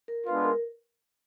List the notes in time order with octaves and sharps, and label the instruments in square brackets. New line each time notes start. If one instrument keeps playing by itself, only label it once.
[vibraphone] A#4
[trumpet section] G#3 B3 D4 F4 [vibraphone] B4
[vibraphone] A#4